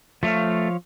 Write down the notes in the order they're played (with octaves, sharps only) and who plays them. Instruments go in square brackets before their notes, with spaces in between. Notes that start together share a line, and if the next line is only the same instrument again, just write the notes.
[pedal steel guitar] F3 C#5 F5 [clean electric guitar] A3